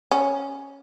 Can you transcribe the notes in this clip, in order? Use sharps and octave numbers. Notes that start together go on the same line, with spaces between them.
C#4